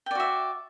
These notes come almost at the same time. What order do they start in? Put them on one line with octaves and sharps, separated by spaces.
G5 D5 F#4 E5